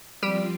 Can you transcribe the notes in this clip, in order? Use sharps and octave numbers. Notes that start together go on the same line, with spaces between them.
F3 G3 C4 F4 G4